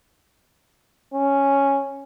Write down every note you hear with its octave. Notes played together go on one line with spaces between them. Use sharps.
C#4